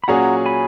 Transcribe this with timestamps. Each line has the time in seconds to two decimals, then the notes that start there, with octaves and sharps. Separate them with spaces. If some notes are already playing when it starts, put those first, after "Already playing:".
0.04 B5
0.08 A#2 F#3 C#4 G#4 F#5 A#5
0.46 G#5 B5